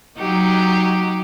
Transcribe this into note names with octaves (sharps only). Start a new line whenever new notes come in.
F#3 D#4 G4